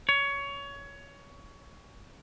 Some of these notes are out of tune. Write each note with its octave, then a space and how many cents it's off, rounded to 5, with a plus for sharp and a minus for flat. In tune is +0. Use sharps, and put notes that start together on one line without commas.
C#5 +20